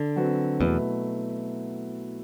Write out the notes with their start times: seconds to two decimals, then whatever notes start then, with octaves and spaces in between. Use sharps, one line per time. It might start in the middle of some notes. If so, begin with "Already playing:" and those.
Already playing: D3
0.16 F#3 C4 F#4 B4
0.61 E2 B2 F#3 A3 E4 B4